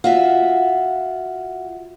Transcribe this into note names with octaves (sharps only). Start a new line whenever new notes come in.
F4 F#4 E5